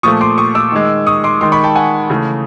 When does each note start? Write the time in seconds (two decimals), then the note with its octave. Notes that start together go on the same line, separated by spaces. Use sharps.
0.03 A#2 F3 A3 C#6 D#6
0.21 C6 D6
0.38 C#6 D#6
0.55 D6 E6
0.72 D#3 G#3
1.07 C#6 D#6
1.24 C6 D6
1.41 D#3 G#3 C6 D6
1.52 B5 C#6
1.64 G5 A5
1.75 F#5 G#5
2.10 C#3 E3 A3